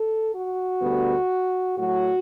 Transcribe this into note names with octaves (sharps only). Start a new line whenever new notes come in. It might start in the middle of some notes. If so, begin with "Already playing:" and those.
Already playing: A4
F#4
D2 D3 G3 B3
A2 F#3 A3 F#4